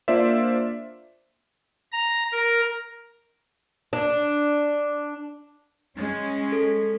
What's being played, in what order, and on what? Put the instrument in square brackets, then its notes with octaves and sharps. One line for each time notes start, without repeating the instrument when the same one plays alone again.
[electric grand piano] A#3 D4 F4 C5 D5 E5
[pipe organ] A#5
A#4
[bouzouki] D4
[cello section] G#3 C#4
[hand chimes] A4